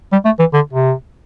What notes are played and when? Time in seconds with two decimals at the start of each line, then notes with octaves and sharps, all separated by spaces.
0.12 G3
0.25 A3
0.39 E3
0.53 D3
0.73 C3